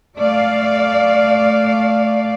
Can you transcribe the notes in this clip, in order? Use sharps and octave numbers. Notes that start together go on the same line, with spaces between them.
A3 D5 F5